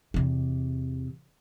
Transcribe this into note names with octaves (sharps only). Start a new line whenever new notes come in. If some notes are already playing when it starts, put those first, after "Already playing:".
E2 C3